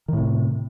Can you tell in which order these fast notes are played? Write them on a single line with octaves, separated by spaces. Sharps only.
D#3 A2 C3